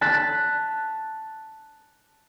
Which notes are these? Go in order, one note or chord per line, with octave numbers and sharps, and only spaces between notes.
A5 F#6 B6